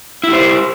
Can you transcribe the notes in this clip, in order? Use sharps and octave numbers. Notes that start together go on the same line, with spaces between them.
E4 G4 C5